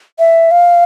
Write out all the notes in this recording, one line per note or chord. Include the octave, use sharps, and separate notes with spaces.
E5
F5